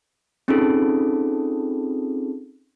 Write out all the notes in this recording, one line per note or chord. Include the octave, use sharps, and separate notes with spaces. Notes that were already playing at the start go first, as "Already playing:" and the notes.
C4 C#4 D#4 F4 G#4 A4